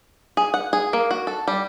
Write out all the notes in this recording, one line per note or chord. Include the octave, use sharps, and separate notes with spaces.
G#4
F#5
G#4
A#3
F#4
A4
G3